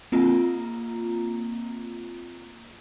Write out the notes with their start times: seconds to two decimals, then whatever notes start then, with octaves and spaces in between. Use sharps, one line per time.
0.12 A#3 C4 F4 A#5